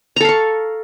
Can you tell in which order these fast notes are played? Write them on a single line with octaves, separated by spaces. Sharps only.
A#5 A4 F5 C#6